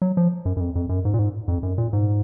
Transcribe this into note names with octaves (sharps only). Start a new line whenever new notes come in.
F#3
F3
F#2
F#2
F2
F2
F#2
G#2
A#2
G#2
F2
F#2
A#2
G#2